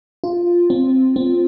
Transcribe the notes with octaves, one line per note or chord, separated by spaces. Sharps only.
F4
C4
C4